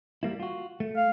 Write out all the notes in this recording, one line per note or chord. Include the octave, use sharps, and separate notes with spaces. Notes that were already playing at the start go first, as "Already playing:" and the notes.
G3 A#3 E4
F4 F#4
A3
F5